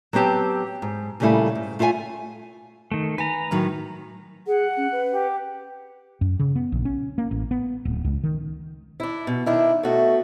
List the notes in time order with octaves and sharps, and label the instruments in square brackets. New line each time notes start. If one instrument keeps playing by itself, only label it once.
[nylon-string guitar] F#3 B3 C4 G4 A5
G#2
A#2 C#3 G3 A3 E4 G#5
G#2
A3 F4 E5 F#5 G#5
[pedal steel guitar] D#3 A3
[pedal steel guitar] B4 A#5 [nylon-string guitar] G#5
[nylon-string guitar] A2 D#3 F#3
[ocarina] G#4 [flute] F#5
[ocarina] C#4
B4
[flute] G4
[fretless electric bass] F#2
C#3
B3
A#1
C#4
A#3
A1
B3
D1
C#2
D#3
[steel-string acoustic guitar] D4 E4
B2
[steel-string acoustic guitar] D#3 D4 [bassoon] E4
[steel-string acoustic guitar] B2 F#4 [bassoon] A3